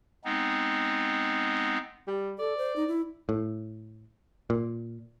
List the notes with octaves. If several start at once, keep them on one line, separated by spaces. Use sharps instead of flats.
G#3 B3 C4 D#4
G3
A4 D5
C5
D#4
E4
A2
A#2